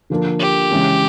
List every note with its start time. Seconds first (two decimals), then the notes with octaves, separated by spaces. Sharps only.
0.10 D3 F3 A#3 D4
0.40 G4
0.71 C#3 E3 G#3 C#4